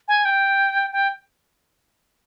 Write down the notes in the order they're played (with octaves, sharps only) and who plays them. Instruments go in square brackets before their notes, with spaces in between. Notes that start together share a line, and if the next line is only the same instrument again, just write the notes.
[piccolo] G#5
G5
G5